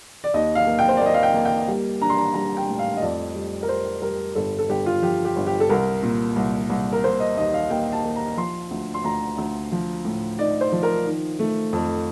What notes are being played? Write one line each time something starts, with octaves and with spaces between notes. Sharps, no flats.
D5
D#2 D#5
F5
A#3
G5
C5
D5
A#3
D#5
F5
G5
A#3
G5
G3
D4 A#5
C6
A#5
G3 A#5
G5
A2
F5
D#5
F2 D5
G3
A#4
G3 C5
G3 A#4
G1 A4
A4
G1 G4
F4
F3 G4
G4
G1
G4
A4
C2 A#4
A#2
C2
C2
A#4
A#3 C5
D#5
D#2 D#5
F5
A#3 G5
A5
A#3
A#5
F3 C6
D2
C6
D2 A#5
D2
F3
A2
D#4 D5
C5
F3
A#4
D#3
A3
F2